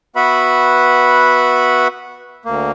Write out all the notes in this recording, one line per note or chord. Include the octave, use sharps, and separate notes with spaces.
B3 F#4 B4 E5 F#5 B5
D2 A#3